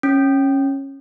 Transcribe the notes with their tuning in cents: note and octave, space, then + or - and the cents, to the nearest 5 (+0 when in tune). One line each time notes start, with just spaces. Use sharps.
C#4 -15